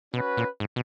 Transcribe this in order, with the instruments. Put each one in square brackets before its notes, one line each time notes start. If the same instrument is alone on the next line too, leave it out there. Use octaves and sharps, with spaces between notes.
[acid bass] B2 [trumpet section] C#4 F#4 B4
[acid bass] A#2
G#2
B2